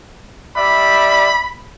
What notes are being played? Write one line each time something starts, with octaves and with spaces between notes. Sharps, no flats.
G3 D5 E5 B5